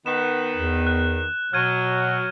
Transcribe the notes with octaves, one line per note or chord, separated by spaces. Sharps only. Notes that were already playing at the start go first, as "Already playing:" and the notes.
D#3 B3 E7
E2
F#6
B2 F#3 F6 G#6 D#7